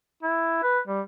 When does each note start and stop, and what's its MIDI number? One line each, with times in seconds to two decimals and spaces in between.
0.23 0.62 64
0.63 0.80 71
0.87 1.01 55